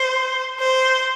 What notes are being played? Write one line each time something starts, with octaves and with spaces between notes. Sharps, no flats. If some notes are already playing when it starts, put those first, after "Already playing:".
Already playing: C5
C5